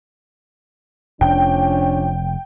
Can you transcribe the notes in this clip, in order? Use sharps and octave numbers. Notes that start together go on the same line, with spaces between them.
F1 F2 F3 C#4 D4 G5